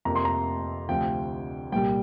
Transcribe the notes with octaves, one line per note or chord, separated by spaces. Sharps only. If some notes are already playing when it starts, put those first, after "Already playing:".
F2 C3 F3 A#3 A#5
C6
A#5
D2 C3 F3 G5
C2 A#2 G3 G5